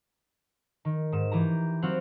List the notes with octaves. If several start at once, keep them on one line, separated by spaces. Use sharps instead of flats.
D#3
G#2 E7
E3 G4 A#5
F#3 C4 F5 F#5